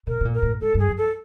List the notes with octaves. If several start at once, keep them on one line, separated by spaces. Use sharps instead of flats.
B2 A#4
B2
A#2
A#4
A2
G#2 A4
G2
G#4
F#2
A4